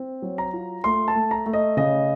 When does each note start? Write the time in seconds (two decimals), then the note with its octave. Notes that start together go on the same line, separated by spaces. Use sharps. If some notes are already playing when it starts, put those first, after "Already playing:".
Already playing: C4
0.22 F#3
0.38 A#5
0.53 F4
0.84 A3 C6
1.08 A5
1.16 A3
1.31 A#5
1.46 A3
1.53 D#5
1.77 C#3 D#5